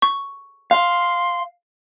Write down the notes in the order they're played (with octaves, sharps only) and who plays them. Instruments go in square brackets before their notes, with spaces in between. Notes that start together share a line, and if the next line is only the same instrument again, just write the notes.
[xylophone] C#6
[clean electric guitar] F5 [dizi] C6